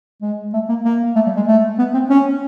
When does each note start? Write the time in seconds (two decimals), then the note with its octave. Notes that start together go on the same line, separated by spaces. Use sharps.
0.22 G#3
0.53 A3
0.69 A#3
0.85 A#3
1.16 A3
1.26 G3
1.36 G#3
1.47 A3
1.79 B3
1.94 C4
2.09 C#4